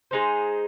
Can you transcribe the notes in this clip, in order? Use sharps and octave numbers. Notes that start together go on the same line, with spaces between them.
G#3 D#4 G#4 C5